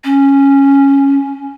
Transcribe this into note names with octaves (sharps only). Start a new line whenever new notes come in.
C#4